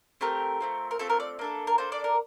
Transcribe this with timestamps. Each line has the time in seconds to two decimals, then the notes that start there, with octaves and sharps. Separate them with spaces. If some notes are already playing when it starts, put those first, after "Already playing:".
0.21 A3 C4 G4 A#4
0.60 A3 C4 F4
0.91 A#4
0.99 A3 C4 F4 A4
1.10 A#4
1.20 D5
1.39 A#3 D4 A4
1.67 A#4
1.78 A#3 D4 A4 C5
1.92 D5
2.04 A#4